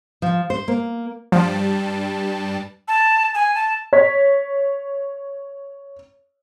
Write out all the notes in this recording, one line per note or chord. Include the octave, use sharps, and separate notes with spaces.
F3
C5
A#3
G2 F3 G3 A5
A5
G#5
A5
C#5 B6